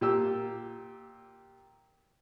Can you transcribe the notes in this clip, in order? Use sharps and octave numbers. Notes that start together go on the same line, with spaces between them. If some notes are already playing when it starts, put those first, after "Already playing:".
A#2 G4 E6